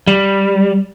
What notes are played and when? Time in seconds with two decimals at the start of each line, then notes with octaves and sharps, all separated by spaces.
0.07 G3